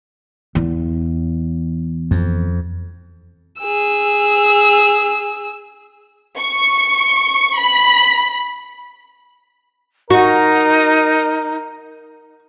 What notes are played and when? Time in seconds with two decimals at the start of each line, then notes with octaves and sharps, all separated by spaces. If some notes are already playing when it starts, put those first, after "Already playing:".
0.55 E2
2.11 F2
3.60 G#4 E6
6.39 C#6
7.58 B5
10.10 D#4 F#4 A#4